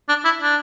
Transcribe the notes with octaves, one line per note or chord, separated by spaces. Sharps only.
D4
E4
D4